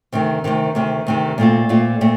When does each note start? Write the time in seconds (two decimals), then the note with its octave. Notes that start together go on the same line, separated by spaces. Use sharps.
0.12 D2 C3 D#3
0.44 D2 C3 D#3
0.75 D2 C3 D#3
1.07 D2 C3 D#3
1.38 A#2 A3 C4 F4
1.69 A#2 A3 C4 F4
2.01 A#2 A3 C4